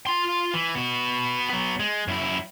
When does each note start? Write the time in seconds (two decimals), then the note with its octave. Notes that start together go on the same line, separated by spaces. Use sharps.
0.07 F4 C6
0.54 E3
0.75 B3 F#4
1.50 F#3 B3
1.80 G#3
2.08 F#2 E4